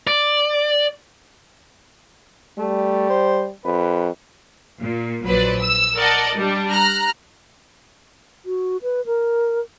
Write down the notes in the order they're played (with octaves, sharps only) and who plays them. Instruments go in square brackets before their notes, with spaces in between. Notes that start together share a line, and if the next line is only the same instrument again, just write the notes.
[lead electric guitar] D5
[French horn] G3 [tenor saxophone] A3
[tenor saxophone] C5
[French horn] F2 [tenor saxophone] B4
[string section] A#2
A#1 F#3 B4 C5 D5
E6
A#4 D5 D#5 F#5 A5
G3 D4
A#5 F6 F#6
[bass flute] F#4
B4
A#4